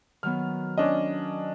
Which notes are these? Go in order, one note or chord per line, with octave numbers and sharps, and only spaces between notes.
D#3 F#3 B3 F6
C#4 D4 D#5